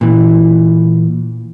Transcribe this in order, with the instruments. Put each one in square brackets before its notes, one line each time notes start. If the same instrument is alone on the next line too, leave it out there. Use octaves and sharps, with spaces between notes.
[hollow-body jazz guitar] A#2 E3